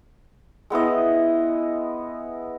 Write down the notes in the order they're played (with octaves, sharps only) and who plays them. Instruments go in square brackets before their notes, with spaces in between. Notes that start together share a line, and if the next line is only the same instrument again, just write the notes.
[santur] G#3 B3 E4 D#5